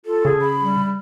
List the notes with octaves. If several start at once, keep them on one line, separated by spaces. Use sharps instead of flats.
F4 A4
C#3 G#4
B5
G3